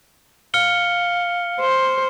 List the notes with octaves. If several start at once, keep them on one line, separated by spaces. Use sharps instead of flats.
F5 F6 C#7 G7
C5